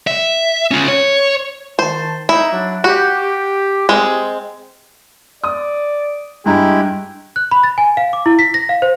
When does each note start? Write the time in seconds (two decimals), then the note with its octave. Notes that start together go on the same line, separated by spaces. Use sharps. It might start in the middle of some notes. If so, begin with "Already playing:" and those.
0.07 E5
0.71 C#4 F4
0.88 C#5
1.79 D#3 C5 A5
2.29 D#4 E4
2.52 F#3 D4
2.84 F#4 G4
3.89 G#3 C4 G4 G#4
5.44 D5 D#6
6.46 G2 G#3 E4 G4 A#5
7.36 F#6
7.51 B5
7.64 A6
7.78 G#5
7.97 F5
8.13 D6
8.26 E4
8.39 B6
8.54 A#6
8.69 F5
8.82 C5